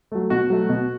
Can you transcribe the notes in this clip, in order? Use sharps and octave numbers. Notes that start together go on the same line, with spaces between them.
F#3 A3
B2 F#4
F#3 A3
B2